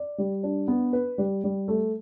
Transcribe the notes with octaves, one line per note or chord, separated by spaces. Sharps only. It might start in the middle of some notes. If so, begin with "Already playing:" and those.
Already playing: D5
G3
D4
B3
B4
G3
G3
A3